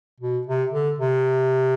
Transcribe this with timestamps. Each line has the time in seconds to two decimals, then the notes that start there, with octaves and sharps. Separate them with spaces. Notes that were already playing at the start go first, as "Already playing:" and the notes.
0.20 B2
0.47 C3
0.72 D3
0.99 C3